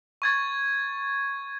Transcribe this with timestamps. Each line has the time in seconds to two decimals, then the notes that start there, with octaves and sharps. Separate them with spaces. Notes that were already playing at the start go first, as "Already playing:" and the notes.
0.22 C#6 G#6 A6